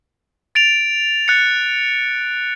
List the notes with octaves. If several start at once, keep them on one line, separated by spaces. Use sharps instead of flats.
A6 D7 F7
F#6 A6 C#7